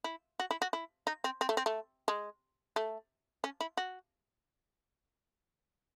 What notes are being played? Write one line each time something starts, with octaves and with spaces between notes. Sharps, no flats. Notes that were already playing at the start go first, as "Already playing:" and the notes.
E4
F#4
E4
F#4
E4
D#4
C4
C4
A3
C4
A3
G#3
A3
C#4
E4
F#4